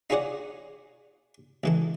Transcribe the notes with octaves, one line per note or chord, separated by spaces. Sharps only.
D#4 F4 G#4 C#5 D5 F#5
C#2 E3 A4